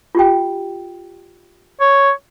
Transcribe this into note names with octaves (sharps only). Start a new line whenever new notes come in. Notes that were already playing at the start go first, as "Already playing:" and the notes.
F4 G4 G5
C#5